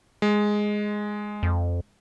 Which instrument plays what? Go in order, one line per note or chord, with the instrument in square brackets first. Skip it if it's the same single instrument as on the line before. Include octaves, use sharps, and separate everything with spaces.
[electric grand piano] G#3
[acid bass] F2